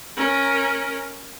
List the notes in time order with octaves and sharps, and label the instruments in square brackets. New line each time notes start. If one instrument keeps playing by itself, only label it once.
[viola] C#4 A#4